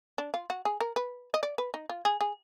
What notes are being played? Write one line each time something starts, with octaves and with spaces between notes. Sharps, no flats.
D4
F4
F#4
G#4
A#4
B4
D#5
D5
B4
D#4
F4
G#4
G#4